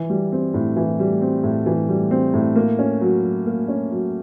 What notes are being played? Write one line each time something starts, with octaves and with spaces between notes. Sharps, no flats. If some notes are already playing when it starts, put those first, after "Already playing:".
Already playing: E3
G3
C4
A2
E3
G3
C4
A2
E3
G3
C4
A2
A#3
C#4
F#3
F#3
A#3
C#4
F#3